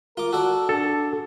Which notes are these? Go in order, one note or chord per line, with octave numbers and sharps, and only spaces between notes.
F4 A#4 D6
F#4 A4 D5
D4 A4